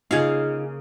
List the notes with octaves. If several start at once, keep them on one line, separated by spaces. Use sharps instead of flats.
C#3 A#3 D#4 F4 G#4 F5